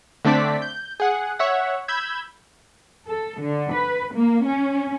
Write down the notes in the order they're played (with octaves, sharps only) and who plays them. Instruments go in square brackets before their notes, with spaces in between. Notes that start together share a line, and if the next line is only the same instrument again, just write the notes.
[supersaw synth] D3 A3 C4 D4 D5 B6
G6
G#4 F#5
C#5 E5 F#5
B5 E6 G6 G#6
[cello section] A4
D3
B4
A#3
C#4